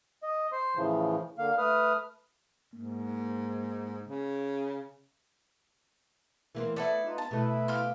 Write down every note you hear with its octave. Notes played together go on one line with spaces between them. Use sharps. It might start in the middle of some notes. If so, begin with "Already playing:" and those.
D#5
C5 C6
A2 C#3 E3 F3
D3 A#3 F5
A3 B4 D#6 F6
G#2 A#3
C#3
E3 A#3 C4
A3 B3 E4 A4 D5
D#4 F4 B4
B3 A5
B2 A3 E4 B4
G4 F5 C6